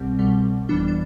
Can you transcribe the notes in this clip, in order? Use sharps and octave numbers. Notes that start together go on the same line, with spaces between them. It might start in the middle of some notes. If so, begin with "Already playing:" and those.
Already playing: C2 B2 G3 C4
C2 B2 G3
G1 F2 E3 G3 B3 D4
D4